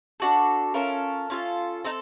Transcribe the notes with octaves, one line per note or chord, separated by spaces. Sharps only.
D4 F#4 A4
C#4 F4 A4 A#4
C#4 F4 A4
C4 D#4 A4